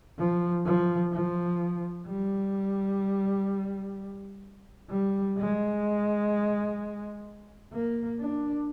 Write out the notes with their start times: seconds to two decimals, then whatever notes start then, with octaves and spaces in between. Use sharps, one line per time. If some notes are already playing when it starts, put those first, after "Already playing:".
0.18 F3
0.65 F3
1.12 F3
2.07 G3
4.90 G3
5.37 G#3
7.73 A#3
8.20 D4